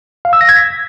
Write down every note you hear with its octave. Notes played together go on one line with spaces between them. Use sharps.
F5
E6
A#6
G#6
B6